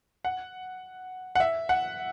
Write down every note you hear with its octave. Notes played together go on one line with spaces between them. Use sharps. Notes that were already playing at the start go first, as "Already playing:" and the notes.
F#5
F#5
E5
F#5